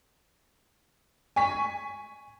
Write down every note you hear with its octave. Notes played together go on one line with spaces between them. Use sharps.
G#5 C#6 B6